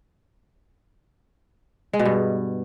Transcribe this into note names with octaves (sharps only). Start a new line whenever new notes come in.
G#3
B2
G2